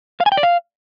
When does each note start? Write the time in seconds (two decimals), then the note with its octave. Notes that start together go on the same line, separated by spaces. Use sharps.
0.20 F5
0.26 G#5
0.32 G5
0.37 D5
0.43 F5